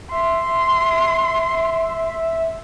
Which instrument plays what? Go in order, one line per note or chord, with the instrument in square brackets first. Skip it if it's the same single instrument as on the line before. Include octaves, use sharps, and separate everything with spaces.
[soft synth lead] E5 [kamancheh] C6